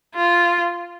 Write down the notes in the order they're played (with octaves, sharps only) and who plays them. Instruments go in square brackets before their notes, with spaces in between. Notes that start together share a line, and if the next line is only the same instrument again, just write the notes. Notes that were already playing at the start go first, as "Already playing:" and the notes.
[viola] F4